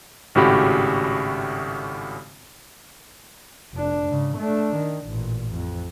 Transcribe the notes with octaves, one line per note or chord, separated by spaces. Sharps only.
G#1 A2 C#3 F#4 G4 B5
F1 D4
G#2 C#3
A3 D4
D#3
A1 A#2
F2